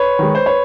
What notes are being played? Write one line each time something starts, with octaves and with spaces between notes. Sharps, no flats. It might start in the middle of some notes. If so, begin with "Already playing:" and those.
Already playing: B4 C#5
D#3 G#3
C5
B4 C#5